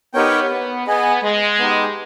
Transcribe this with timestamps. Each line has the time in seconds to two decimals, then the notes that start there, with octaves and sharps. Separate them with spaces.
0.14 B3 D#4 G4 A#4 C#5 G5
0.50 B3
0.87 B3 G#4 D#5 G#5
1.23 G#3
1.59 B3 D#4 G4